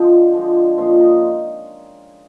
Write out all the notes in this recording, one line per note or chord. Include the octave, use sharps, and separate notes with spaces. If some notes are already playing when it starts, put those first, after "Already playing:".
Already playing: D3 F3 G#3 C4
D3 F3 G#3
A#2 F3 G#3 C4
C#4
D#4